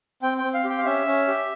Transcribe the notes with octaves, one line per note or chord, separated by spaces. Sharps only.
C4 G5
G5
C4
F5
G4
G5
F5
C#4 E5
C#4
G4